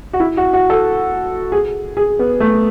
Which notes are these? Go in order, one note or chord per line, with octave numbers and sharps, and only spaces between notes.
F#4
E4
F#4
F#4
A4
G#4
G#4
B3
A3